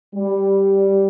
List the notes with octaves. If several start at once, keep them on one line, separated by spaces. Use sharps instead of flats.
G3